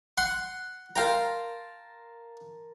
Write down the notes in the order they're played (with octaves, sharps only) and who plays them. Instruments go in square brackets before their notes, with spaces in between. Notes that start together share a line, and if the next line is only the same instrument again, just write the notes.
[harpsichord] F#5 C6
[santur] A#4 A5 C6 [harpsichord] F5 G5 A#5